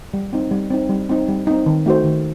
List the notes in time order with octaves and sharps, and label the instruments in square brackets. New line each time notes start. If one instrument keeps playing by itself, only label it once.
[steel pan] G3
C4 D#4
G3
C4 D#4
G3
C4 D#4
G3
C4 D#4
D#3
A3 D#4 F#4 C5
D#3